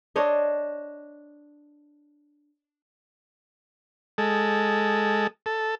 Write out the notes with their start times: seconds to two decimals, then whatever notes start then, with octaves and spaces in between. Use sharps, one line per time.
0.16 D4 C5 C#5 D#5
4.18 G#3 A4
5.46 A4